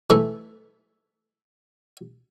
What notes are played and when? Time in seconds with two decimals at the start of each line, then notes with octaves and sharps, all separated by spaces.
0.10 E3 A3 E4